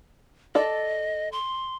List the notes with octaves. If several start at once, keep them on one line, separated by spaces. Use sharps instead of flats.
A4 D5 D#5
C6